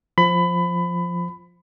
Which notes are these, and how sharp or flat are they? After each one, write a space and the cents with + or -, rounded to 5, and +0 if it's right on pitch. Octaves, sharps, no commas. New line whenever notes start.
F3 +0 B5 +20